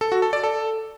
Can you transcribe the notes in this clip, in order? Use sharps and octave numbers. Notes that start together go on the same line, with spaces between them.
A4
F#4
A4
D5
A4